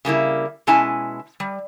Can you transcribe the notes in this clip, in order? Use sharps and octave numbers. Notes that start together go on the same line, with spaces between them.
C#3 G3 A#3 E4
B2 G#3 C#4 E4 G#5 A5
G3